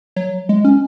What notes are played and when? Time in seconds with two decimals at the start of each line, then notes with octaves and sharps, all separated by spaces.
0.16 F#3
0.49 G#3
0.65 C#4